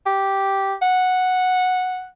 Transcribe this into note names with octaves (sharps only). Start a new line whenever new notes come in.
G4
F#5